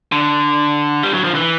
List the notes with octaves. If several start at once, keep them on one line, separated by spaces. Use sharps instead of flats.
D3
G3
F#3
F3
E3